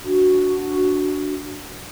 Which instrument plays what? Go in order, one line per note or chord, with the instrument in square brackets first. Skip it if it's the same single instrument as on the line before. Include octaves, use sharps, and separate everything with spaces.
[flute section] D4 F#4